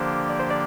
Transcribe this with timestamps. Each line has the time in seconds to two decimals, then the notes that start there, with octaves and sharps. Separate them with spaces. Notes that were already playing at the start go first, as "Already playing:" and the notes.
Already playing: D3 F3 A#3 D4 G4 C5
0.30 D5
0.39 C5
0.50 D5